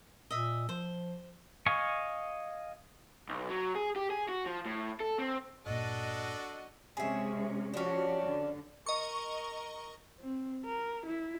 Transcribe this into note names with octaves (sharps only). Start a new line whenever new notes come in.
A#2 D#5 E5
F3 C5
D#5 F5 G#5 C#6
B1
F#3
G#4
G4
G#4
F#4
F3
A2
A4
C4
G1 A#2 D4 F#4 A4 D#5
C3 G#3 C#4 G#4 E5
F3 C#4 D4 F#4 G4
D3
A#4 D#5 C#6
C4
A#4
E4